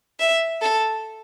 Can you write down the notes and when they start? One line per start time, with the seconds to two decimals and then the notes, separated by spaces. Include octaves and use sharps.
0.20 E5
0.62 A4